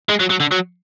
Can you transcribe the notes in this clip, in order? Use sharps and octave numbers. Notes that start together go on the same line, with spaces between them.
G#3
F#3
F#3
D3
F#3